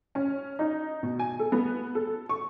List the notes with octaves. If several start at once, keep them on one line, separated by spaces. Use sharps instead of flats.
C#4
D#4
B2
G#5
A4
B3
A4
C#6